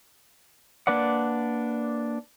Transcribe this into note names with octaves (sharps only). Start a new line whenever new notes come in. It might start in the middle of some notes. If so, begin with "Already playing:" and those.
A#3 D4 B4 D5 F#5